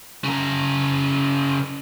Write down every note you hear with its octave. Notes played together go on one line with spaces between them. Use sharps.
C#3 A#4